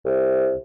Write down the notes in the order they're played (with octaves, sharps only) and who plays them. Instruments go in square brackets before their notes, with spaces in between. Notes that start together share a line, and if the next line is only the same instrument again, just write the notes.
[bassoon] C2